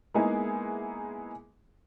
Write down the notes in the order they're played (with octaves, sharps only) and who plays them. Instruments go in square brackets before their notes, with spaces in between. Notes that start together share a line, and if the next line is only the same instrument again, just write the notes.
[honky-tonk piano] G#3 A#3 B3 D#4 E4 G#4